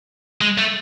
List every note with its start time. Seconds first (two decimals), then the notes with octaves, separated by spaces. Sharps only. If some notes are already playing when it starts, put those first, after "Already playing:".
0.41 G#3
0.58 A3